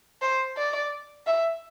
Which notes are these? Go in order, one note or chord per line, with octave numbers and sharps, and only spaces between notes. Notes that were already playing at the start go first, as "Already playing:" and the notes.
C5
D5
E5